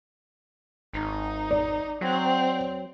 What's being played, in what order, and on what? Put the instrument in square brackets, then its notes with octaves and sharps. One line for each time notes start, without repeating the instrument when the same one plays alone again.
[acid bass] G#1 [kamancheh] D#4
[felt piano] D5
[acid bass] F#3 [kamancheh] C4